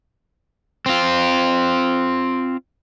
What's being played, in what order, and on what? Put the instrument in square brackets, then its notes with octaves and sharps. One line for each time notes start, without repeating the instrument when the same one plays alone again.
[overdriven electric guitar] C4 F4